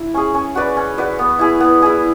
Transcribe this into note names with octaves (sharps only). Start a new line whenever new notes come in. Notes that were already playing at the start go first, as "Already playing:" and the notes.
Already playing: E4
C#4 G#4
C#4
F#4 B4 D5
C#4
F#4 B4 D5
B3
E4 G#4
B3
E4 G#4